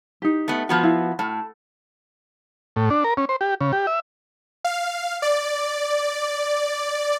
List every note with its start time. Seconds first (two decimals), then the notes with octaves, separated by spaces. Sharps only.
0.22 D#4 G4
0.48 A3 B3
0.69 F3 B3 F#4
0.83 E4 F5
1.19 A2 A5
2.76 A2
2.90 D4
3.04 A#4
3.17 C#4
3.29 C5
3.41 G4
3.61 C#3
3.73 G4
3.87 E5
4.64 F5
5.22 D5